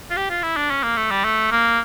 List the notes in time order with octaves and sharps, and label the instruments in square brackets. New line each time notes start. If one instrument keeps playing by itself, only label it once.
[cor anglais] F4
G4
F4
E4
D4
C#4
A#3
A3
G3
A3
A#3